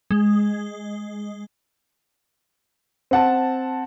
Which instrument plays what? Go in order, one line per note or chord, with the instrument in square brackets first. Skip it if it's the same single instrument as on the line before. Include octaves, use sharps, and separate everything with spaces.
[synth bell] G#3
[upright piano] C4 F#5 A5